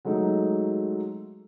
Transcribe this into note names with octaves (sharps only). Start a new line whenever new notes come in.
F#3 G#3 A3 D#4